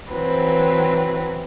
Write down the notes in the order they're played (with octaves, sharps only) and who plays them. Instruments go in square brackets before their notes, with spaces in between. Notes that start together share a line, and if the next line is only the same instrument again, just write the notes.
[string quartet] E3 F#3 C4 B4